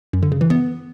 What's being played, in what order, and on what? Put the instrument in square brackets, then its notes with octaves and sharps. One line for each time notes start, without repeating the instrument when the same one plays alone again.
[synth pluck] F#2
D3
C#3
E3
B3